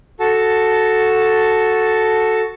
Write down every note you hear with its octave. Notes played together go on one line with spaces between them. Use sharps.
F#4 A4 A5